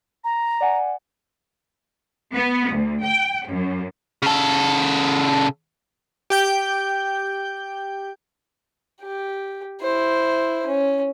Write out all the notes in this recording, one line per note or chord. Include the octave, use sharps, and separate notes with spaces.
A#5
D5 F#5 G#5
B3
D2
G5
F#2
C#3 A4
G4 G5 G6
G4
E4 C5
C#4